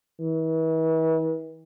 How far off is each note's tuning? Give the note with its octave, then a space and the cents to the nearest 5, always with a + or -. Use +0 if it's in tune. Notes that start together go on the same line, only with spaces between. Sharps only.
E3 -40